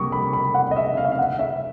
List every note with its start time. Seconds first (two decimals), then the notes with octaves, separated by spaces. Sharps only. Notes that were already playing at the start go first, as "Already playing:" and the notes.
Already playing: C3 G3 A#3 C#6 D#6
0.12 B5
0.33 B5
0.54 F#5
0.71 D#5
0.76 E5
0.97 F5
1.05 E5
1.11 F5
1.19 F#5
1.39 E5